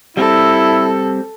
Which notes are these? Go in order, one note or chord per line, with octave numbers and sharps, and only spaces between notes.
G3 C4 E4 A4